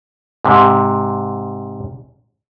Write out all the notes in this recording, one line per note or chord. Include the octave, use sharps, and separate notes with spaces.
G#2 C3